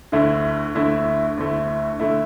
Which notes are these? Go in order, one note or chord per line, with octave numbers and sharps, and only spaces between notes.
D2 D3 A3 E4
D2 D3 A3 E4
D2 D3 A3 E4
D3 A3 E4